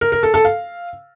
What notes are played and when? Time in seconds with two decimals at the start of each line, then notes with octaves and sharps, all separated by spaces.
0.01 A#4
0.12 A#4
0.23 A4
0.34 A4
0.45 F5